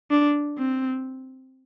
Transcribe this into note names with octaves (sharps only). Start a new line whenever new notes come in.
D4
C4